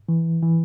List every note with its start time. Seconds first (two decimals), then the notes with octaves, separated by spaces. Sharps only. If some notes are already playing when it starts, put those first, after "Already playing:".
0.09 E3
0.43 E3